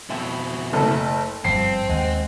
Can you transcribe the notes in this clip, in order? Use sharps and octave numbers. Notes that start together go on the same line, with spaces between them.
F2 B2 E4 E5
F#1 A3 A4
G1 G2 F3 C4 C5 C7
D#2 G#3 D#5 F#5